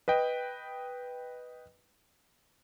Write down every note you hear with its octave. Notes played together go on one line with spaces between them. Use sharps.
B4 D#5 G5